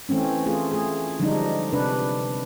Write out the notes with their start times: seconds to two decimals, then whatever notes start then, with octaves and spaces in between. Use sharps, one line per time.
0.09 E3 A3 C4 C#4
0.46 A3 F4 G#4
0.72 A3 G#4
1.19 D3 F3 G3 G#3 D4 D#4
1.73 C3 D4 B4